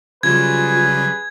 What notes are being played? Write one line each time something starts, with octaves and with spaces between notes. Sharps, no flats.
C#3 F#3 G3 F4 G#4 B4 G#6